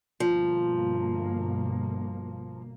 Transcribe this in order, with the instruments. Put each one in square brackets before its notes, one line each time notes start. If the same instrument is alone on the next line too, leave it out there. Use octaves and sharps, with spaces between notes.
[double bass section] G1 B2 A#3 [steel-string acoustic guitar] F3